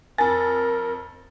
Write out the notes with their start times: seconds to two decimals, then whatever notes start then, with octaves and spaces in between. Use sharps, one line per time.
0.18 F2 A#4 G#5 A5 A6